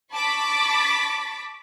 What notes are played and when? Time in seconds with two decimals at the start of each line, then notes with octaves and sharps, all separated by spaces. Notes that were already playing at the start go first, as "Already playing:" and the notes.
0.13 A5 B5 C#6 D6 A6 B6